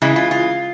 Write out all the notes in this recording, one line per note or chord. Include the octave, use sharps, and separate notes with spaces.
C#3 E3 G#3 E4
F4
F4